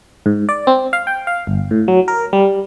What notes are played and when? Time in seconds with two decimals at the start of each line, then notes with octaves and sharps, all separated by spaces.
0.26 G#2
0.49 D5
0.67 C4
0.93 F5
1.07 G5
1.27 F5
1.47 G1
1.71 A2
1.88 F#3
2.08 A#4
2.33 G3